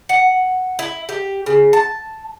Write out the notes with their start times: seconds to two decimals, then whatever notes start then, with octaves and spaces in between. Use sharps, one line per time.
0.09 F#5
0.79 E4
1.09 G4
1.46 C#3
1.73 A5